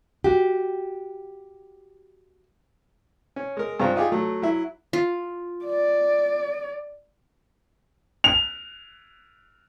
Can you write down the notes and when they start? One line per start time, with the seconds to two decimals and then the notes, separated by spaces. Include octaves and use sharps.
0.24 F#4 G4
3.36 C#4
3.57 G#3 A#4
3.80 G2 C#3 C4 F4 A#5
3.96 D#4 F4 G4 G#4
4.12 F#3 A3
4.42 F#3 E4
4.93 F4
5.65 D5
8.24 F7